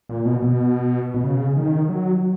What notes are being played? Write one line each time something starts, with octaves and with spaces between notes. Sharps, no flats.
A#2
B2
B2
B2
C#3
D#3
F#3